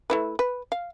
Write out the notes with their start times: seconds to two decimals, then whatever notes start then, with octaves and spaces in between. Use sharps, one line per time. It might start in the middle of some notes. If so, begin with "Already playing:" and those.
0.10 A3 E4 B4
0.39 B4
0.72 F5